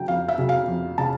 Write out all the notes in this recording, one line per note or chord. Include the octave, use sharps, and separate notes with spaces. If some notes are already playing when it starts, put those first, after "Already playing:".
Already playing: C#3 F#3 G5
F2 F5
E5
C#3 F#3
F5
F2
C#3 A5